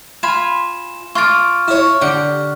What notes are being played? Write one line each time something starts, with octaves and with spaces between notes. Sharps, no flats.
F4 G#5 B5 E7
F4 C#6 D6 F6 A6
E4 C#5
D3 G4 F#5